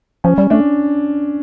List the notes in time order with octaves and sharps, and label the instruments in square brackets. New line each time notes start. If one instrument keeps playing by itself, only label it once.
[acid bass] F3 [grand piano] C#4
[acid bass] G3
[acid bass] A3 [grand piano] D4